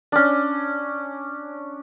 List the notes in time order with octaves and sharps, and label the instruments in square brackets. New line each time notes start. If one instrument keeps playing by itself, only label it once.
[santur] C#4 D4